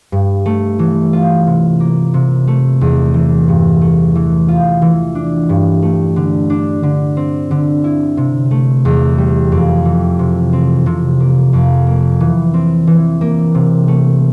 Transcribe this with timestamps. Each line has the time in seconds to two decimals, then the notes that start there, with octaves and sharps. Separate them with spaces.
0.12 G2
0.46 A3
0.79 E3
1.13 F4
1.46 C3
1.80 A#3
2.14 C3
2.47 A3
2.81 E2
3.14 E3
3.48 G2
3.81 A3
4.15 E3
4.48 F4
4.82 E3
5.15 D4
5.49 G2
5.82 A3
6.16 D3
6.50 D4
6.83 D3
7.17 C4
7.51 D3
7.84 E4
8.17 C3
8.51 A3
8.85 E2
9.18 G3
9.52 F2
9.85 E3
10.19 C3
10.53 C4
10.86 C3
11.20 A#3
11.53 F2
11.87 A#3
12.20 E3
12.54 C4
12.87 E3
13.21 A#3
13.55 C3
13.88 A3